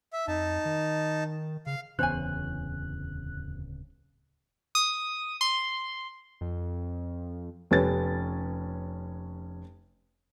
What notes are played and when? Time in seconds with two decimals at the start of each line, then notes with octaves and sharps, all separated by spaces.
0.13 E5
0.28 F2 D#4 A5
0.65 D#3
1.66 C#3 F5
1.99 D1 E2 C#3 C5 C#5 G#5 F#6
4.75 D#6
5.41 C6
6.41 F2
7.71 F1 C#4 B4 A6